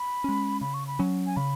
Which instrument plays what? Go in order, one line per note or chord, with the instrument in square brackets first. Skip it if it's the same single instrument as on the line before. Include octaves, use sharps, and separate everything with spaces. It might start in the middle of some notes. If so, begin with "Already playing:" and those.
Already playing: [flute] B5
[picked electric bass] G#3 C#4
[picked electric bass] C#3 [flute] B5
[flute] C#6
B5
[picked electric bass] F#3 C#4
[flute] G#5
[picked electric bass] C#3 [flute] B5